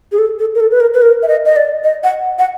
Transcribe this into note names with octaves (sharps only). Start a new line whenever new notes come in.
G#4
A4
A4
A#4
A4
B4
A#4
B4
A#4
E5
D#5
D#5
D5
D#5
F#5
F#5